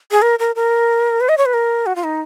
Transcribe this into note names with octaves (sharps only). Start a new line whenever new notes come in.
G#4
A#4
A#4
A#4
B4
D#5
C#5
B4
A#4
F#4
F4
D#4